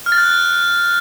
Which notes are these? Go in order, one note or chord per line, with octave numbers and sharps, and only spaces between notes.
F6
A6
F#6